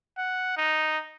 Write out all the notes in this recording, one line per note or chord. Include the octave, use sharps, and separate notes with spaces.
F#5
D#4